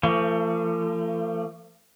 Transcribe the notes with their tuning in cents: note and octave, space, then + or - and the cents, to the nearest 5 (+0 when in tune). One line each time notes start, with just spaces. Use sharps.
F3 -35 A3 +35